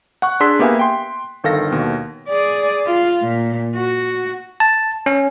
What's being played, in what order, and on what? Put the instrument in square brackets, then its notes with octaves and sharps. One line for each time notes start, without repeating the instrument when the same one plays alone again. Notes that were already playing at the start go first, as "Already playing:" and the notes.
[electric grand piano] F#5 C#6 F#6
D4 G#4 C6 E6 B6
A#3 B3 G4 E5 F5 G#5
G5 C6
G1 D#3 A4 F5 A#6
D#2 B2
[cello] G#4 D5
F4
A#2
F#4
[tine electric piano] A5
C#4